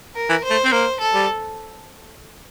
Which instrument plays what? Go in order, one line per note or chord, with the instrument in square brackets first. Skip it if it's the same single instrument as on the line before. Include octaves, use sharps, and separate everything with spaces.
[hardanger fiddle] A#4
[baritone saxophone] E3
[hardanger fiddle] C5
[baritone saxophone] A3
C4
[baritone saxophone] A#3 [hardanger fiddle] C5
[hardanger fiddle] A4
[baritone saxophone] G3